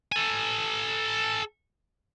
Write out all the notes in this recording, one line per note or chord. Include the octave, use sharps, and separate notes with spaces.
A4 G#5